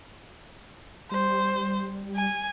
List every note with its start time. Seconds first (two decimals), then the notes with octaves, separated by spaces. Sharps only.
1.11 G3 C5
2.16 G#5